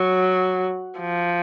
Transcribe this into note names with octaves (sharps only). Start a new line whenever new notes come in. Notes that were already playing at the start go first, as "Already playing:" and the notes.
Already playing: F#3
F3